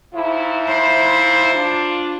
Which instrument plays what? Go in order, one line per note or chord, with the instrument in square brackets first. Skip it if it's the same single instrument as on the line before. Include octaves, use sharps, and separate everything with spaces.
[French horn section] G#2 F3 E4
[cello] C5
[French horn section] D4 F4